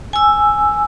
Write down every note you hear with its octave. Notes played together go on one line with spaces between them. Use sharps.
G#5 E6